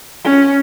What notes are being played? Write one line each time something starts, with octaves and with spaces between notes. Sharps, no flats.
C#4